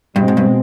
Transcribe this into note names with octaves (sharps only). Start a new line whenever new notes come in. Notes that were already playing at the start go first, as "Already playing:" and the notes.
G2 B2 G#3 C4
G#2
G2